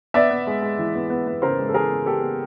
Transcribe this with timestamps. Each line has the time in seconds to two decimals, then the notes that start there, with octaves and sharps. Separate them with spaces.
0.14 B3 D5 E5
0.31 B3
0.47 G#3
0.62 G#3
0.79 E3
0.95 B3
1.10 B3
1.27 B3
1.42 C#3 A#4 C5
1.58 G#3
1.68 A4
1.74 E3 G#4 A#4
1.90 B3
2.06 B3 G4 A4
2.22 B3